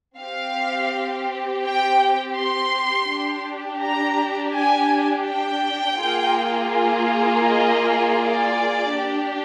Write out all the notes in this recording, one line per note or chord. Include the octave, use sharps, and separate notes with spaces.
C4 G4 F5
G5
C6
D4 G4
A#5
G#5
G5
A#3 F4 G#4
D#5
D5
D4 G4